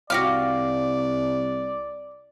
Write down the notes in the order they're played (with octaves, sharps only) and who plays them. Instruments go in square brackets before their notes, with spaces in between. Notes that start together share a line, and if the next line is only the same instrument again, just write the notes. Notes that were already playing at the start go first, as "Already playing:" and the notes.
[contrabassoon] C2 [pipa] F#4 G4 F5 [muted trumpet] D5